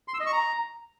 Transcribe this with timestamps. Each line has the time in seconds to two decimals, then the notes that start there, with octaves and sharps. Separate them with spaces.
0.08 C6
0.14 E6
0.20 D#5
0.26 C#6
0.32 A#5